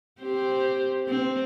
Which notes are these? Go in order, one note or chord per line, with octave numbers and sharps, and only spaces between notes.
C4 G4 C5
C4